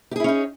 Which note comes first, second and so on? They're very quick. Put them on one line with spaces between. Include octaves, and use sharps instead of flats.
G4 G#4 E4 C#4 D#4